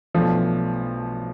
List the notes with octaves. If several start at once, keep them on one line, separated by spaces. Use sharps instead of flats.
B1 B2 F3 A3 D4